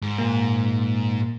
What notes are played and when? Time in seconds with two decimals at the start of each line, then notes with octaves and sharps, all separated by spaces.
0.02 G#2
0.19 A#2 A#3